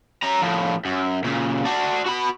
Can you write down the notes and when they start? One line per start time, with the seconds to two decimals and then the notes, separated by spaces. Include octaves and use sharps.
0.23 C#4 A#5
0.42 A2 F3
0.85 F#2
1.24 A#2 C#3
1.65 D4 F#4
2.06 F#4 B5